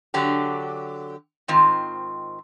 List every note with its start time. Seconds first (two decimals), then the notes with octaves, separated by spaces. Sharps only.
0.14 D3 F#3 G4
1.48 G#2 D#3 C4 F4